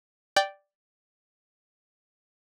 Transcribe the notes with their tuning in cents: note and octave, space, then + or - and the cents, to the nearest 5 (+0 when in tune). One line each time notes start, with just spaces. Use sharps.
D5 +0 G5 -5